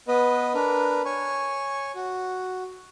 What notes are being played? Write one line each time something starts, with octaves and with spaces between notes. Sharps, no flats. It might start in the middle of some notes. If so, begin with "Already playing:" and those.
B3 B4 D#5
D4 A#4 B4
C#5 G#5 C#6
F#4